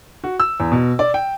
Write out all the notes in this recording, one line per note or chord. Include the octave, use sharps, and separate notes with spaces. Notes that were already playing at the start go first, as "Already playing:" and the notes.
F#4
E6
E2
B2
D5
G5